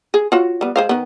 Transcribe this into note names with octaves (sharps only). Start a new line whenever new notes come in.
G#4
F4 F#4 C#5
G3 B3
G#3 C5 F5
D#3 B3